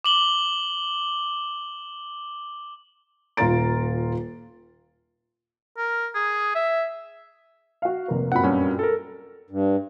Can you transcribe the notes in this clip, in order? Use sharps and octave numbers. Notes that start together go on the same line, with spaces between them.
D6 F#7 G7
D#1 F4 A#5 A6 D7
A#4
G#4
E5
F#4 F5
F1 A#3
F#2 A#2 C4 F#5 B5
G2 C#4
A4 A#4
G2